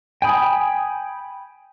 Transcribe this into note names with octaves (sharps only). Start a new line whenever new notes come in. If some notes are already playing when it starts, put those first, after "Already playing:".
G5 G#5 B5 D#6